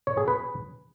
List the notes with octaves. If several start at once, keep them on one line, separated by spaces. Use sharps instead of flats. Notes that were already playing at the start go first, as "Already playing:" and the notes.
C#5
G#4
B4